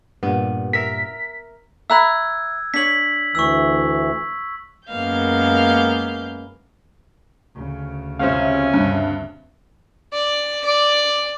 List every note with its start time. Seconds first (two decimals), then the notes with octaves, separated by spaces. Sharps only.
0.23 G2 A#2 B3
0.73 A#4 E5 B6
1.90 E5 A#5 B5 E6 F#6 G#6
2.74 D4 C#5 B6 F#7
3.35 D2 E3 C#6 E6
4.89 F#2 G#3 A#3 B3 F5 G6
7.56 D2 C#3
8.19 C#2 C3 C#4 C5 F5
8.73 G2 C3
10.13 D5
10.65 D5